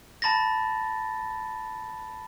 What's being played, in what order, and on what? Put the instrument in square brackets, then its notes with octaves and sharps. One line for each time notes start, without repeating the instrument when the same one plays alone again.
[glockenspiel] A5 B5 A6 A#6